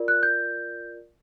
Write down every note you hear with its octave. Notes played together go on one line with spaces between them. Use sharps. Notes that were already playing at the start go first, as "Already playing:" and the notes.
Already playing: F4 A#4 D5
F#6
G6